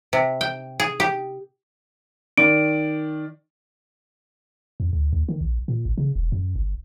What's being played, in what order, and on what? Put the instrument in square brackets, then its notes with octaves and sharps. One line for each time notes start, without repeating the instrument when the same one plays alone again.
[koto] C3
G5
G#4
G4
[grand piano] D#3 D5 [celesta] D7
[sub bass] F2
D2
D#2
D#3
A#1
A#2
G#1
C#3
E1
F#2
G1